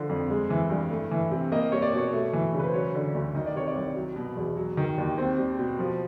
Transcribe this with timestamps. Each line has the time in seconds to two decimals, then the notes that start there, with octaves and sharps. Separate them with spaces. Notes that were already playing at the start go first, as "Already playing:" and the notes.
Already playing: D3 F3
0.09 F2
0.30 G#3
0.50 E3
0.70 G2
0.91 A3
1.11 E3
1.31 C3
1.52 A#3 D#5
1.72 G3 C#5
1.82 D5
1.93 B2 C#5
2.13 A3
2.33 E3
2.54 C#3
2.59 B4
2.67 C5
2.74 F#3 C#5
2.94 D3
3.15 D2
3.35 D#3 D#5
3.46 D5
3.55 C3 C#5
3.68 D5
3.75 C2
3.96 F#3
4.16 B2
4.36 E2
4.57 F#3
4.77 D#3
4.98 D#2
5.18 C4
5.38 G3
5.59 B2
5.79 F3